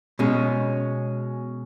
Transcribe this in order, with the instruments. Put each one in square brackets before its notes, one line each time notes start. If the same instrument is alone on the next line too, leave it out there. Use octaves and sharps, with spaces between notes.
[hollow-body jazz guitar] B2 G#3 C#4